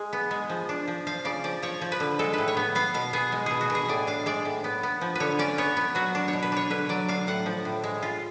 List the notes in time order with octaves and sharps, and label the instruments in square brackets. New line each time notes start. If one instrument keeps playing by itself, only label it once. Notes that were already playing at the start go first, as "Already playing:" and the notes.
Already playing: [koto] G#3 G#4
B3
G#3
F3
D4
F3
F3 F5
C#3 D5
F3 D5
F3 C#5
F3
B4
D3
G#3 A4
A2 B4
C#5
B3
B3 F5
B2 F5
B3 G#4
G#3
B2 G#4
F#4
B2
G#4
A2 D5
D4 F5
G#3 D5
A2
B3
B3
F3
D3 B4 C#5
C#4 D5
B3 C#5
B3
F#3 F#4
D4
C#5
B2
B4
D4 C#5
D3 B4
F#3 D5
D4 F5
A2 F#5
F3
A2
G#3
F4